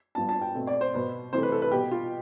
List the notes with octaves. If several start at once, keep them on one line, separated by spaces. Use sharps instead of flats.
G2 F3 B3 A5
A5
G5
B2 A3 C4
D5
C5
B2 B3
C3 E3 A3 C5
B4
A4
B4
B2 B3 G4
F4